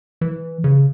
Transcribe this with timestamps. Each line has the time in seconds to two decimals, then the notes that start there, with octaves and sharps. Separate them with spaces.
0.21 E3
0.64 C#3